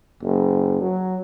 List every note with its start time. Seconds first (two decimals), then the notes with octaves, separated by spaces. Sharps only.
0.23 F#1
0.81 F#3